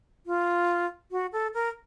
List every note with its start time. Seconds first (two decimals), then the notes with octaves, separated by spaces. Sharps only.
0.26 F4
1.11 F#4
1.33 A4
1.54 A#4